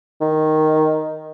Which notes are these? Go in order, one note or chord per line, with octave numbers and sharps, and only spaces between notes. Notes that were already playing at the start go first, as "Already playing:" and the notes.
D#3